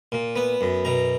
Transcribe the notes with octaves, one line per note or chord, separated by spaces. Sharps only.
A#2
B3
F#2
B2 A#5